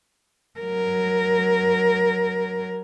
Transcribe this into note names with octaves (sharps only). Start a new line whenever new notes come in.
F#3 A#4